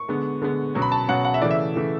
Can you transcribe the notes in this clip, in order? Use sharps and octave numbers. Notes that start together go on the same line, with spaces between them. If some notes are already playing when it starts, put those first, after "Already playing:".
Already playing: C#6
D3 G#3 B3
D3 G#3 B3
B2 F#3 C#4
B5
A5
B2 F#3 C#4 F#5
F#5
E5
C#3 E3 A3 D5
E5
C#3 E3 A3